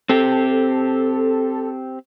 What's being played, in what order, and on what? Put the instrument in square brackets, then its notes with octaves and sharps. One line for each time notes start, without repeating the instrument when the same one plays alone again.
[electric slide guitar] C4 G4 [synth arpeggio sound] A4